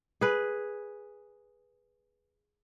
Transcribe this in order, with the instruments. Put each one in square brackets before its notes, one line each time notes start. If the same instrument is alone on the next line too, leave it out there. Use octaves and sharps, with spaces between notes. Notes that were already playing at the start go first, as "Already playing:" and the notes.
[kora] G#4 B4